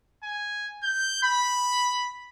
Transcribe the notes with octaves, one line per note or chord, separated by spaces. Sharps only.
G#5
G6
B5